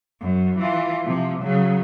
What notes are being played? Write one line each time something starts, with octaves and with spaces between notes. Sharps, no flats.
F#2
E3 F4
C3 F3
C#3 F#3